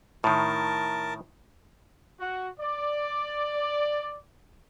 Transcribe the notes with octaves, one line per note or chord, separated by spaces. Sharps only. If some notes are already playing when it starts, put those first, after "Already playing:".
A2 D#3 A#4 A5
F#4
D5